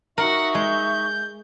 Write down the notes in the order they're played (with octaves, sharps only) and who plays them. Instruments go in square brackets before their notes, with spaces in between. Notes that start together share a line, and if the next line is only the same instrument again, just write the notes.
[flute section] D#4 E5 C#6 [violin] F#4 F#5 [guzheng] A#4
[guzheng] G#3 [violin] G6